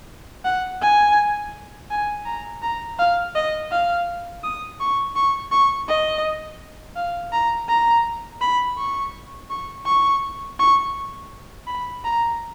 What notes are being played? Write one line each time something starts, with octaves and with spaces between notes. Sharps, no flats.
F#5
G#5
G#5
A#5
A#5
F5
D#5
F5
D#6
C#6
C#6
C#6
D#5
F5
A#5
A#5
B5
C#6
C#6
C#6
C#6
B5
A#5